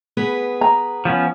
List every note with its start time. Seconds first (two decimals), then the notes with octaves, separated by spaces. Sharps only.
0.17 B3 G#4 B4
0.61 A#5
1.05 F3 B3 C#4